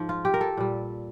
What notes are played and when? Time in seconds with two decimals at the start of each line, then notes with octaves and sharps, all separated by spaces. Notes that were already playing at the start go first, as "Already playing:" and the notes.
Already playing: G#2 F3
0.09 F4
0.25 G4
0.34 A#4
0.41 A4
0.57 A#2 G3